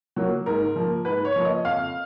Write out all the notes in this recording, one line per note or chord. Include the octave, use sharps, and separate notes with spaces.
F#3 A#3
G#2 A#4
F3 A#3
G#2 B4
C#5
F3 A#3
D#5
F2 F5